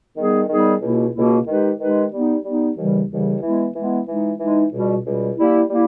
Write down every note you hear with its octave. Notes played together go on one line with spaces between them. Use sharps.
D#3 G3 B3 D#4 G#4
D#3 G3 B3 D#4 G#4
C#2 B2 A#3 E4
C#2 B2 A#3 E4
D#3 G#3 D#4 G4 B4
D#3 G#3 D#4 G4 B4
G3 B3 D#4
G3 B3 D#4
D#2 C#3 E3 G3
D#2 C#3 E3 G3
E3 G#3 B3 E4
E3 G#3 B3 E4
E3 G#3 D#4
E3 G#3 D#4
C#2 B2 G3
C#2 B2 G3
G3 A#3 E4
G3 A#3 E4